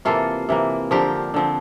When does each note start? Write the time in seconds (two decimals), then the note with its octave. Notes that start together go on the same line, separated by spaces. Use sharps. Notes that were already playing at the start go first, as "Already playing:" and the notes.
0.05 C3 E3 A#3 F4 A4
0.49 C3 E3 A#3
0.91 D3 F3 C4 G4 A#4
1.34 D3 F3 C4